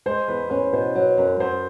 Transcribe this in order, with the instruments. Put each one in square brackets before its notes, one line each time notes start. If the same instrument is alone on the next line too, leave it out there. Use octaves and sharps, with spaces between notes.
[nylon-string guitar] G#3 [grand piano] C5
[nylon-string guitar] E2 [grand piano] B4
[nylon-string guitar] C#4 [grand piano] B4
[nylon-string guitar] B2 [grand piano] C5
[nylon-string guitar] F#3
F#2
[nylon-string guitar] F#2 [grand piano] C5